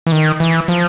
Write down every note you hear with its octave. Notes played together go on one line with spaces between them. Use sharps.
E3
D#3
E3
F3